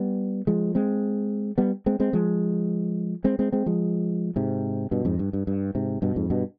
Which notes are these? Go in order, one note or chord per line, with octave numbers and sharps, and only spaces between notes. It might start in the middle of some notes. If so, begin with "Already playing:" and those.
Already playing: G3 B3
F3 G#3
G#3 C4
G3 B3
G#3 C4
G#3 C4
F3 G#3
G#3 C4
G#3 C4
G#3 C4
F3 G#3
G#2 C3
G2 B2
F2 G#2
G2
G2
G2
G#2 C3
G2 B2
F2 G#2
G2 B2